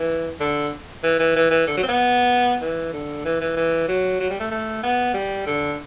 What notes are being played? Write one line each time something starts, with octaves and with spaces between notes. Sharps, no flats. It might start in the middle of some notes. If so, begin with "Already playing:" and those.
Already playing: E3
D3
E3
E3
E3
E3
D3
F#3
C4
B3
E3
D3
E3
E3
E3
F#3
F#3
G3
A3
A3
B3
G3
D3